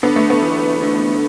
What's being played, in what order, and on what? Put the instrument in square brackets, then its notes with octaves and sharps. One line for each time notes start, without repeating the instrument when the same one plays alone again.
[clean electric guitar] D3 [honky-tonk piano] B3
[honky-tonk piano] A3
B3
[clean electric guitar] E2
D3